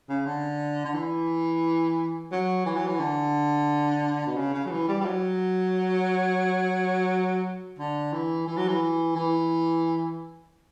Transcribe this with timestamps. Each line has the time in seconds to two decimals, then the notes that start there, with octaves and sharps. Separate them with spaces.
0.09 C#3
0.26 D3
0.85 D3
0.94 E3
2.32 F#3
2.66 E3
2.76 F#3
2.87 E3
3.00 D3
4.27 B2
4.36 C#3
4.54 C#3
4.66 F#3
4.70 E3
4.88 G3
5.01 G3
5.05 F#3
7.79 D3
8.13 E3
8.47 E3
8.57 F#3
8.68 E3
9.16 E3